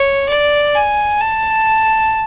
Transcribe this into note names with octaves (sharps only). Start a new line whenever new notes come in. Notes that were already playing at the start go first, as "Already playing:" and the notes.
Already playing: C#5
D5
G#5
A5